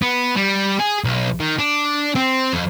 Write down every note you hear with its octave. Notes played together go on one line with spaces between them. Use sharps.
B3
G3
G#4
B1
D#3
D4
C4
F2